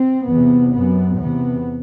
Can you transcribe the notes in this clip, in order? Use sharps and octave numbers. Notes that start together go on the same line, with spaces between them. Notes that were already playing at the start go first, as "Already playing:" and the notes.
Already playing: C4
E2 C3 B3
F#2 B3
E2 C3 B3